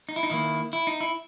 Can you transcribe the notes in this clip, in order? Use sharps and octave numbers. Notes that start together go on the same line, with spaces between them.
D#4
E4
D#4
D#3 A#3 E4
E4
D#4
E4